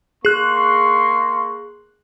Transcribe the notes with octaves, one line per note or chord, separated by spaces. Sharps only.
A#3 G#4 C6 C#6 F#6